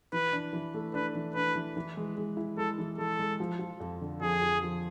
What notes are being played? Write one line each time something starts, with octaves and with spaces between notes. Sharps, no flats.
E3 B4
D4
E3
A3
D4 B4
E3
D4 B4
E3
E3
G#3
G#3
E4
G#3 A4
E3
G#3 A4
G#3
F3
F3
F2
D3
F2 G#4
F2
F3